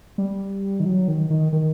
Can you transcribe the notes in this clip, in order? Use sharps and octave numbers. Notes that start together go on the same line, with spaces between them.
G3
D#3
F#3
D#3
D#3
D#3